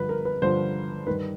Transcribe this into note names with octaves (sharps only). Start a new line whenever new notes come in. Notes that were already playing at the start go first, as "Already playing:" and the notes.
Already playing: G2 D3 F3 B4
A#4
B4
G2 D3 F3 C5
G2 D#3 B4